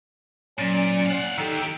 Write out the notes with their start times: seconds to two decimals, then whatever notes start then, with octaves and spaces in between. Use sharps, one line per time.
0.59 A#2 F#3 C#4 D5
1.06 F5 F#5
1.38 D#3 D#4 G4 A4